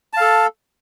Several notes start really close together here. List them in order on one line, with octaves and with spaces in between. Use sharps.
A5 F5 A4